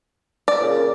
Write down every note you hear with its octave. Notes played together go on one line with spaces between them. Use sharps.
D5
A#2 C#3